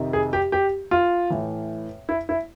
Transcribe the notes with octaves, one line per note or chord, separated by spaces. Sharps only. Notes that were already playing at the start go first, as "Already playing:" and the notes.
Already playing: F2 C3 D#3
G#4
G4
G4
F4
A2 E3
E4
E4